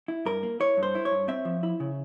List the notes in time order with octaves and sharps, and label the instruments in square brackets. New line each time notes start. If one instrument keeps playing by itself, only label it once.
[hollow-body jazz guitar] E4
G2 A#4
A#3
E4 C#5
G2
C5
E4
C#5
G2
C4 E5
F3
E4
C#3